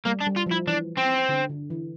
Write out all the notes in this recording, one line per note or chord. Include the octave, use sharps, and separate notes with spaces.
G3 A#3
D4
G3
F4
F3 E4
E3 D4
C4
D3
D3
E3